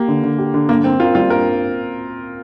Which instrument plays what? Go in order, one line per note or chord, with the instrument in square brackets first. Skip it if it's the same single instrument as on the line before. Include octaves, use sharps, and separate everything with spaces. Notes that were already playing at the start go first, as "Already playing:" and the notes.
Already playing: [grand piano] A#3 [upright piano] G4
[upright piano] D3
D3
G4
D3
[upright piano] G2 [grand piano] A#3
[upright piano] A#3 [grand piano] C4
[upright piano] A#3 [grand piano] F4
[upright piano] G3 [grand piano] F4
[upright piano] G2 [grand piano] A#4